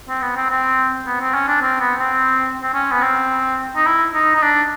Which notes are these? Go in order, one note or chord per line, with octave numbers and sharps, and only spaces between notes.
C4
B3
C4
C4
B3
C4
C#4
D4
C4
B3
C4
C4
C#4
B3
C4
D#4
E4
D#4
D#4
D4